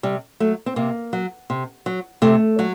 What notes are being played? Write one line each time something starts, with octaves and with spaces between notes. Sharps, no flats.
C3 G3
F#3 A3
C4
C3 A#3
F#3
C3
F#3
C3 A3
F#3